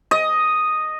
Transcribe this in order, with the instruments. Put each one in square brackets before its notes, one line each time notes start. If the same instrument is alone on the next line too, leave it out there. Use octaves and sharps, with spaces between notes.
[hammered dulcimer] D#5